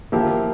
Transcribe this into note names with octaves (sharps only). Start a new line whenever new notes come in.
F3 A#3 E4 G4